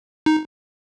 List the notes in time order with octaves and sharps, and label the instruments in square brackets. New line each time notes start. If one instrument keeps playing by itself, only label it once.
[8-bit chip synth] D#4